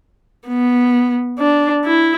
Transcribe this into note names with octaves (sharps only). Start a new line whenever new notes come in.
B3
D4
E4